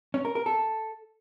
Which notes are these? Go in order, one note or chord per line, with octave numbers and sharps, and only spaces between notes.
C#4
A#4
A#4
A4